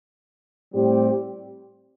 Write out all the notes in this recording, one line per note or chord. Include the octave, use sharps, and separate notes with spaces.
A2 G3 C4 G4